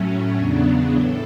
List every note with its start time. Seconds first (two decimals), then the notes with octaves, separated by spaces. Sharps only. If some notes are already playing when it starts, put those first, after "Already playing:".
Already playing: A2 F#3 A3 C#4
0.35 E2 C#3 F#3 B3 D4
0.95 A2 A4